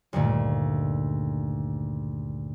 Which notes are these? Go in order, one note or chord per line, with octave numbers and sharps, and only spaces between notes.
D2 G2 A#2 D#3 A3